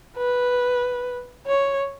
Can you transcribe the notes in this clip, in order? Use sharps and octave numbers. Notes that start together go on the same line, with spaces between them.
B4
C#5